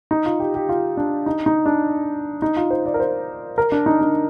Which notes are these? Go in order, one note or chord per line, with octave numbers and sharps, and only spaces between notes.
D#4
F4
G4
G4
F4
D4
D#4
D#4
D4
D#4
F4
C5
D5
A#4
C5
A#4
D4
D#4
D4